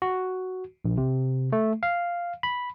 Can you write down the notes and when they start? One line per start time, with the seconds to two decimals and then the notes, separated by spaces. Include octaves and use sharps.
0.02 F#4
0.85 A#1
0.97 C3
1.52 A3
1.83 F5
2.43 B5